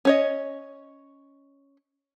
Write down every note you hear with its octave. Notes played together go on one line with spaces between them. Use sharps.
C#4 C#5 D#5